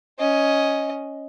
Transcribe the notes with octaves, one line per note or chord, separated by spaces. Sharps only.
C#4 D#5